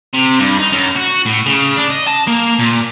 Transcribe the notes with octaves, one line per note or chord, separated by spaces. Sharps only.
C3
G2
D#4
F#2
F#4
A2
C#3
D4
D#5
A5
A#3
A#2